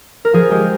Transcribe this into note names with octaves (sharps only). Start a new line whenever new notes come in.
A#4
F3 G#4
G#3 G4